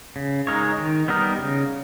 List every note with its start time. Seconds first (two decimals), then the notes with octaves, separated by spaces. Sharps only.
0.16 C#3
0.47 G#3 D#4 A#4 C#5
0.78 D#3
1.08 G3 B3 D#4 A#4
1.38 C#3